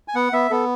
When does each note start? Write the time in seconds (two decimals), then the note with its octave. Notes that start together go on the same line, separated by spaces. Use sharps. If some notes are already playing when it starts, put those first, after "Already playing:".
0.08 G#5
0.15 B3 F#5
0.33 B3 E5
0.50 B3 A4